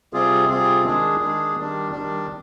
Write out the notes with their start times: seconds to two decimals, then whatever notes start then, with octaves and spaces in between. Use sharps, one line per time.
0.13 C3 G3 C4 F4 G#4
0.49 C3 G3 C4 F4 G#4
0.85 D#3 G#3 D4 G#4
1.20 D#3 G#3 D4 G#4
1.56 D#3 G3 D4
1.92 D#3 G3 D4